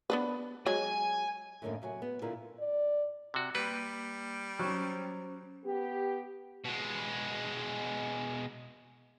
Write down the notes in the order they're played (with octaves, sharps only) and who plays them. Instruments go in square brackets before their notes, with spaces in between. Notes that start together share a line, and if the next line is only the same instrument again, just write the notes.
[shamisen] B3 D4 B4
[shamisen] F#3 G#3 [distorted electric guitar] G#5
[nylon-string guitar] F#2 A2 D3 D#3 A#3 D#4
C3 F#3 G#5
B3
A#2 D3 E4 A#4
[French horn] D5
[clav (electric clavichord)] C3 F#4
[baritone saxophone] G3 [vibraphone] A#3 [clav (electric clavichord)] B4
[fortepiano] F#3 [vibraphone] C#4 C5
[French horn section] B3 G4
[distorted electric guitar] B2 G#3